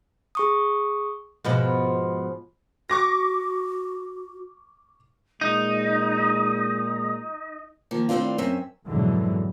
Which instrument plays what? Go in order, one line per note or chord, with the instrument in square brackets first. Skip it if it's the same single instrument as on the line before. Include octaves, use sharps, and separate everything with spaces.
[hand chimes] G#4 C#6 D#6
[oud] G#2 B2 F3
[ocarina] F#4 [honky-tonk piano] C#6 D6 A#6
[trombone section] A#2 G#3 [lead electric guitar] D#4 [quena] D#6
[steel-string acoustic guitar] D#3 F3 A#3
A2 D#3 C4 D4 F4
F#2 C4 C#4 E5
[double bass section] F2 G#2 B2 D3 E3 F#3